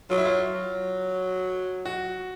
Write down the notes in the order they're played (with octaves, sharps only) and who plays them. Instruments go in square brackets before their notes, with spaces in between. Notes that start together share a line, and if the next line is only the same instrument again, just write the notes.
[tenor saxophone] F#3 [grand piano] F4
[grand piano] E4
F4
[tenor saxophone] F#3
[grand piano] F#4